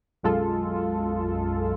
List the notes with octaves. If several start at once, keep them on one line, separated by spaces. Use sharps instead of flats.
B1 F#2 G#3 F4 A4